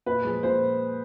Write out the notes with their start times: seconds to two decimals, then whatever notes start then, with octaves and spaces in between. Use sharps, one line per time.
0.06 A#2 B4
0.25 F3 G#3
0.43 A#2 C5